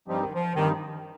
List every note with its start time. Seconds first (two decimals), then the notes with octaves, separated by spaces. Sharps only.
0.08 G2 F3 G3 C4 D#4 G4
0.22 D#3
0.35 F3
0.56 G2 D#3 G3 C4 D#4 G4